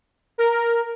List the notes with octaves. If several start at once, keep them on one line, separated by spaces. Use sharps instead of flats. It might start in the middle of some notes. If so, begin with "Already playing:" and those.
A#4